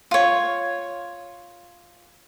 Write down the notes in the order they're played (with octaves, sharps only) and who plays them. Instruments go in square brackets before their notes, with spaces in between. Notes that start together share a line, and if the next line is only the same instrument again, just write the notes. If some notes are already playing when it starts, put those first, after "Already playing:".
[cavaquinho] F4 C#5